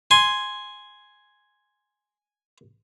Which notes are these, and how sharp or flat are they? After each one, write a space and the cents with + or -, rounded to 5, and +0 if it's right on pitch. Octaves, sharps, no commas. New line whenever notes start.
G#5 +0 C6 +0